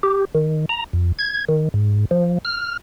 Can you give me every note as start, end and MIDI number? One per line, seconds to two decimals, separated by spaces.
0.03 0.25 67
0.35 0.66 51
0.69 0.84 82
0.93 1.12 41
1.19 1.45 92
1.49 1.69 51
1.74 2.05 44
2.11 2.38 53
2.45 2.77 89